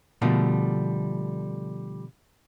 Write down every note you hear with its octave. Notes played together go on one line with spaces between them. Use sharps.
B2 D3 F3 G3 A3 A#3